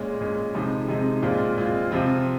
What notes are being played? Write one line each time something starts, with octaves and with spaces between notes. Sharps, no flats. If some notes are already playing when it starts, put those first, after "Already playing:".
Already playing: A#2 G#3 C#4
A#2 G#3 C#4
C3 F3 G#3 D#4
C3 F3 G#3 D#4
A#2 G#3 C4 F4
A#2 G#3 C4 F4
C3 F3 C4 F4